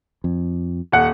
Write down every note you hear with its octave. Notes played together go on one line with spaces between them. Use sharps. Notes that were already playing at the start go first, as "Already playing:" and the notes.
F2
D#1 F#5